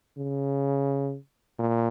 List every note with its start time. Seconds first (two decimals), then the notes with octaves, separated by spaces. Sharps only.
0.18 C#3
1.59 A#2